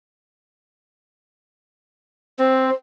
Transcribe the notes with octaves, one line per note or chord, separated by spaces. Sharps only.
C4 C5